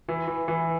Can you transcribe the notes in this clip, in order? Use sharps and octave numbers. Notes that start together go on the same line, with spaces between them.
E3
E3
E3